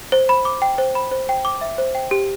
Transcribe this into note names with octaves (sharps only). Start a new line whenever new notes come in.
C5
B5
D6
G5
C5
B5
C5
G5
D6
E5
C5
G5
G4